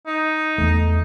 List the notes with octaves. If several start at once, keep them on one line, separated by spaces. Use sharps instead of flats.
D#4
E2 A3